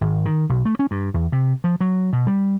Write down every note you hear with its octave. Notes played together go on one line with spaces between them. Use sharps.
G#1
D#3
B1
A3
C#4
G2
E2
C3
F3
F#3
B2
G3